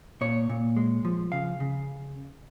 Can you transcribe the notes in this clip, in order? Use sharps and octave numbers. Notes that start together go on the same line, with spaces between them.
A#2 C#5
A#2
G#3
F3
C#3 F5
C#3